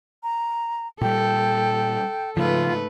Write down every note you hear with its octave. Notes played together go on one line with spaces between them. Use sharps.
A#5
A#2 G3 A4 G5
G#2 C#3 F3 A3 F4 B4